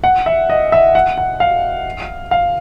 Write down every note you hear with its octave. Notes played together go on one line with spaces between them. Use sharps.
F#5
E5
D#5
E5
F#5
F#5
F5
F5